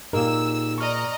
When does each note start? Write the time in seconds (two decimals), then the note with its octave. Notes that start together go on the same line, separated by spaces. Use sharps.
0.13 A#2 D#4 G4 G#4 A#4 E6
0.78 D5 D#5 A#5 C#6 F6